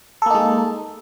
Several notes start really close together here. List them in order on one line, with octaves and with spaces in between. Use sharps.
A4 A#3 D#4 G#3